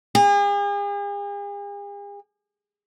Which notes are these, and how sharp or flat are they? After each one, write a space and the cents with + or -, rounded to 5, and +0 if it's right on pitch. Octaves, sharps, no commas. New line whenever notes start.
G#4 -45